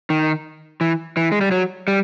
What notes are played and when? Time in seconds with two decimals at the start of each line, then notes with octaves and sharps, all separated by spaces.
0.10 D#3
0.81 E3
1.17 E3
1.32 G#3
1.41 G3
1.51 F#3
1.88 G3